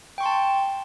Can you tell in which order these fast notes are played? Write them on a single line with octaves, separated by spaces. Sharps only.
G5 C#6 C6 A5